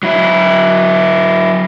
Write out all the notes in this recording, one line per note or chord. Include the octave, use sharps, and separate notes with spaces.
F#3 E4